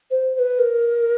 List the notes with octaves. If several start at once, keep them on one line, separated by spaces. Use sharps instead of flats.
C5
C5
B4
A#4